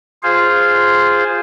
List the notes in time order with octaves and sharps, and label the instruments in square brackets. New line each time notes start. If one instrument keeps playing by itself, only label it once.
[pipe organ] F4 G#4 C5 F5